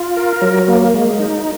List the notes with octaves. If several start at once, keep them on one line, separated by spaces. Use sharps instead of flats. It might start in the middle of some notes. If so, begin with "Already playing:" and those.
Already playing: F4
A#4
F#3
A#3
G#3
D#4